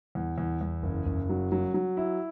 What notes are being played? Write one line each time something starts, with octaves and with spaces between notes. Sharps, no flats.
E2
E2
E2
F#1
F#1
F#3
F#3
F#3
E4